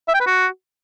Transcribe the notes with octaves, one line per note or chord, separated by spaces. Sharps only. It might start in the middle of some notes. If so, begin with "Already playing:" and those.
E5
G5
B4
F#4